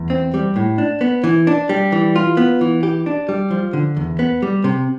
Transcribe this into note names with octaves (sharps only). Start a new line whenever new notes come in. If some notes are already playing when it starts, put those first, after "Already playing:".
Already playing: E2
C4
G3
A2
D4
B3
E3
D4
G3
E3
F4
B3
E3
G4
D4
G3
F3
D3
E2
B3
G3
C3